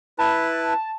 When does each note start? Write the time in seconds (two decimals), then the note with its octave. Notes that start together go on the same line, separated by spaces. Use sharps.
0.19 E4 B4 A5